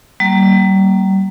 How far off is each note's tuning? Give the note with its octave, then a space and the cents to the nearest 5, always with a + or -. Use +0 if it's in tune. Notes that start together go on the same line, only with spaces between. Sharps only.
G3 -35 A#3 +0